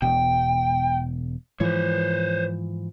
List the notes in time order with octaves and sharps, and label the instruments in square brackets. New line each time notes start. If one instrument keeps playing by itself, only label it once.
[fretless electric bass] E1 B2 [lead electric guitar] G5
[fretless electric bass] G#2 E3 F3 [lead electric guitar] C5 C#5